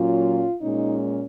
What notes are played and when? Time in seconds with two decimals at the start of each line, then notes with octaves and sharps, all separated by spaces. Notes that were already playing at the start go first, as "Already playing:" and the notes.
Already playing: A#2 F#3 C#4 F4
0.61 A#2 G#3 C#4 D#4